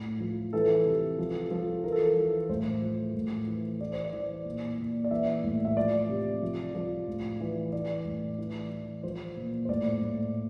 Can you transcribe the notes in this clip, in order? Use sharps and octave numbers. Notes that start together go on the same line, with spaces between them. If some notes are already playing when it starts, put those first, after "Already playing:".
Already playing: A2
F3
E3 A4
C3
F3
F3
E3 A#4
A4
A#4
E3
A2 C5
F3
A2
E3
E3 D5
C5
D5
E3
A#2
A#2
D5
E3 E5
A2
E5
F3 D5
C3
F3
F3
A2
E3
E3 D5
A2
E3
E3
F3 C5
A#2
C5
A2 D5
A2